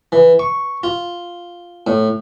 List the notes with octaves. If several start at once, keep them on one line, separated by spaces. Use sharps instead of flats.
E3
C#6
F4
A2